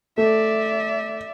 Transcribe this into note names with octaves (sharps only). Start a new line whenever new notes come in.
A3 D5 E5